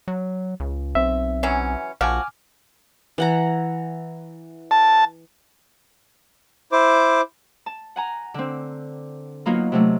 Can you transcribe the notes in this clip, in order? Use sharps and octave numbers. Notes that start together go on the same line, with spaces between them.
F#3
C#2
B1 C4 E5
E3 F#3 C#4
A#1 F3 F#4 G#5 D6 F6
E3 F#5 A#5
A5
E4 C5 D6
A5
F#5 G#5 A#5
D3 C4
F#3 A#3 B3 D#4 F4 F#4
C3 F#3 A3